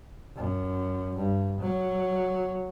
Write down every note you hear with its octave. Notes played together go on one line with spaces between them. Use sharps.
F#2
G2
F#3